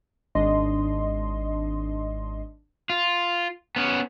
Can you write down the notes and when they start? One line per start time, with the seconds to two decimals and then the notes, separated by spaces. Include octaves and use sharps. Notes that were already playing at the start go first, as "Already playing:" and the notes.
0.35 G#1 D4 D#5 C6
2.90 F4
3.76 B3 C#4